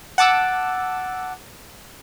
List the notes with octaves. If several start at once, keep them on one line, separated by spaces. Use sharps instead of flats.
F#5 A5 D6 E6